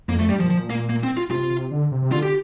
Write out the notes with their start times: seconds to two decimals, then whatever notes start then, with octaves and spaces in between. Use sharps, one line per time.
0.08 F2 A#3
0.19 F2 A3
0.29 G2 G3
0.39 A#2 F3
0.50 F3
0.70 A#3
0.89 A#3
1.03 C4
1.17 F4
1.30 C3 F4
1.51 C3
1.71 D3
1.92 C3
2.02 C3
2.12 D3 F4
2.23 G4